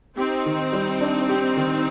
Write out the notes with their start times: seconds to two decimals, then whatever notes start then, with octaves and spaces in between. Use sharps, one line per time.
0.18 C4 D#4 G4
0.46 D#3
0.73 G3
1.01 D4
1.29 G4
1.57 D#3